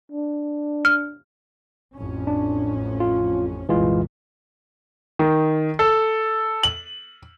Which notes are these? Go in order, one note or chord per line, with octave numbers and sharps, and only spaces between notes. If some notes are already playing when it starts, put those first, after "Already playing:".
D4
F6
A1 F2 C#4
D4
F4
C2 F#2 A#2 E3 G#3 F4
D#3
A4
F#7